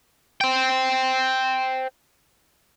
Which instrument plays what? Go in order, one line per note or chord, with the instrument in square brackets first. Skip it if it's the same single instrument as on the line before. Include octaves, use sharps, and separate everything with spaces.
[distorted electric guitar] C5 G5